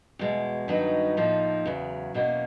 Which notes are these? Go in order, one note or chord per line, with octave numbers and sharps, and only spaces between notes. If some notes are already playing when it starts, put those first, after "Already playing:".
E2 B2 G#3
G2 D#3 F#3 B3 D#4
A2 F3 A#3 D#4
E2 C#3 F#3
E2 B2 F#3 A#3 C#4